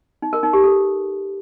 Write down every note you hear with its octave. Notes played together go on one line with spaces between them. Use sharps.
D#4
A#4
D#4
G4
A4